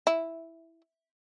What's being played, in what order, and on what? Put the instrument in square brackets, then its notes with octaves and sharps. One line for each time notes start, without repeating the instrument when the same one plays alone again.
[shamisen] E4